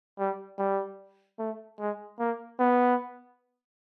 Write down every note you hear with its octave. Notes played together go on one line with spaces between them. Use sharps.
G3
G3
A3
G#3
A#3
B3